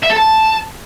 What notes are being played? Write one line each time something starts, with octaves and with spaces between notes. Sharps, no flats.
E5
A4
A5